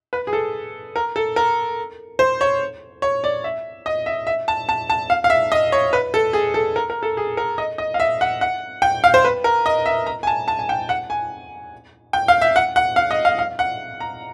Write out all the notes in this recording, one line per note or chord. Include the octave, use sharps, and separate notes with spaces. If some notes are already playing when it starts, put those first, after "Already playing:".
B4
G#4
A4
A#4
A4
A#4
C5
C#5
C#5
D5
E5
D#5
E5
E5
A5
A5
A5
F5
F5
E5
D#5
C#5
B4
A4
G#4
A4
A#4
A#4
A4
G#4
A#4
D#5
D#5
F5
E5
F#5
F#5
G5
F5
C5
B4
A#4
D#5
E5
A#5
G#5
A5
A5
G#5
G5
F#5
G#5
G5
F5
E5
F#5
F#5
F5
D#5
F5
F5
F#5
A#5